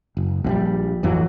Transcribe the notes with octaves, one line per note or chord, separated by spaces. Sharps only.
F#1
A#1 C#3 G3
A1 F2 E3 F#3